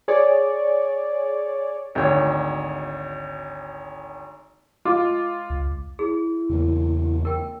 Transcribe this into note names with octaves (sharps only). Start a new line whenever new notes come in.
G#4 C#5 D5
G#1 D2 C#5
G#3 F4 D6
C#2
E4 G#4
E2 C#3 E3 A#3
A#4 G5